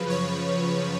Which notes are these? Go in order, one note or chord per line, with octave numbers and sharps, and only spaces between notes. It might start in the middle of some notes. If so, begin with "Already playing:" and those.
Already playing: F#2 C#3 F3 B4
C#5